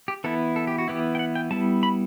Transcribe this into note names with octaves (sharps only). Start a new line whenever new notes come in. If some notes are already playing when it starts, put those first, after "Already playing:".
G4
E3 B3 E4 A4
A4
G4
F#4
E3 B3 E4 G4
G5
F#5
G5
G3 B3 E4 A5
B5